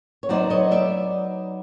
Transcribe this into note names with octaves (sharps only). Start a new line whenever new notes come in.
C#5
F#3 B3 D#4 C5 D5
C#5 D#5
D5 E5